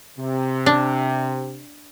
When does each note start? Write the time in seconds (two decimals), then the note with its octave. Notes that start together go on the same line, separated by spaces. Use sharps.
0.19 C3
0.66 D4